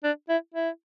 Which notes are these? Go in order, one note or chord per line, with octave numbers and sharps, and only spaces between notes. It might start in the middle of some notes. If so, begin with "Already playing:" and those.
D4
E4
E4